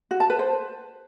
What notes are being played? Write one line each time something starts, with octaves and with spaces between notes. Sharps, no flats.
F#4
A5
B4
C5